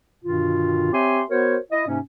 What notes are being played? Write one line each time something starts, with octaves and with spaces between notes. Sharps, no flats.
G2 B2 D3 D#3 F4
C4 G4 C#5 E5 G#5 C6
B3 F#4 A#4 C5 C#5
E4 D#5
G#2 C3 A#3 C#4